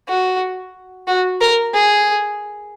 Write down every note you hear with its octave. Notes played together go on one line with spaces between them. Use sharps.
F#4
F#4
A#4
G#4